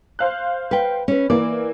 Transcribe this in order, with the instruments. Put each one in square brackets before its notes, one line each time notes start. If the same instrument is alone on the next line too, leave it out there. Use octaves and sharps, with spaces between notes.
[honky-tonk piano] C5 F5 F#6
[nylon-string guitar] B4 G5
C#4 B4
[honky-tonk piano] E3 A#3 [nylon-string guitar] D5